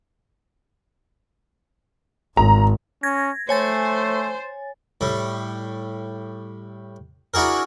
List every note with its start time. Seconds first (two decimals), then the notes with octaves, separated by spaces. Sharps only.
2.37 G#1 A#5
3.03 C#4 G#6 A#6
3.49 A3 C5 C#5 G#5 A6
5.01 A2 G3
7.34 D4 E4 F#4 G#4 A#4